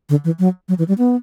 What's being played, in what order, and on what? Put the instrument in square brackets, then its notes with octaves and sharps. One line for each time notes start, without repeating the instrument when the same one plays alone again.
[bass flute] D3
E3
F#3
F#3
E3
G3
B3